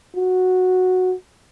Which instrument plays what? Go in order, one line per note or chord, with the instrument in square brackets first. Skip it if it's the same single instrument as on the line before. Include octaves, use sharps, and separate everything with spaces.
[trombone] F#4